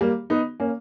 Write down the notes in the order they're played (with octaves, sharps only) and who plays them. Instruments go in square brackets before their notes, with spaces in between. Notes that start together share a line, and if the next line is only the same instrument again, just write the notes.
[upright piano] G3 A#3
B3 D#4
A#3 C#4